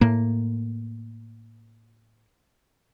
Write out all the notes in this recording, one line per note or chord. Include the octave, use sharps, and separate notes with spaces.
A2 A#3